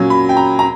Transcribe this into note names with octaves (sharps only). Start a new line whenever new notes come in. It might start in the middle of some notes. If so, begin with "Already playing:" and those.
Already playing: A#2 F#3 C#4
B5
G5
A#5
A#5